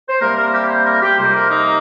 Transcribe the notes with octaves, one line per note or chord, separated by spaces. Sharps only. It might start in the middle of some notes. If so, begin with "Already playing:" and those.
C5
C3 G3 A#3 A#4
A#4
G4
C5
A#4
G4
F2 C3 G3 A#3 C5
A#4
D#4